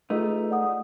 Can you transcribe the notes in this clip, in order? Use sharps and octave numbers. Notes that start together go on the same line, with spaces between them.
A3 D#4 F4 G#4 B4
D5 F#5 D#6